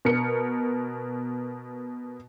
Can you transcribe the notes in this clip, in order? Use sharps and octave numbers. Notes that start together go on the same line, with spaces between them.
B2 A#4 C#7